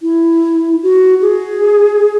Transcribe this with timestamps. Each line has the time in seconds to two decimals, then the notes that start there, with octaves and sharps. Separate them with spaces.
0.02 E4
0.83 F#4
1.21 G#4